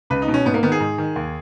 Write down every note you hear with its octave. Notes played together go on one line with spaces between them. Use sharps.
C#2 B4
D#4
B2
C#4
G#2 B3
A#3
D#3 B3
G#4
G#2
D#3
D#2